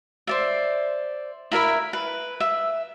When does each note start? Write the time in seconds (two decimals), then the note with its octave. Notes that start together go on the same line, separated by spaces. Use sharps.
0.27 C5 D5 E5
1.52 E4 A#4 E5 B5
1.93 B4
2.40 E5